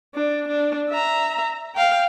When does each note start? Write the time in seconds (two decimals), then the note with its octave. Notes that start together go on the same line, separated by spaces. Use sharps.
0.14 D4
0.48 D4
0.90 E5 A#5
1.75 F5 G5